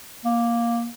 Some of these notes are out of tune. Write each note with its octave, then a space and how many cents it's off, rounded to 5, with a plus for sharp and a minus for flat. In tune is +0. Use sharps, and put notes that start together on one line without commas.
A#3 +10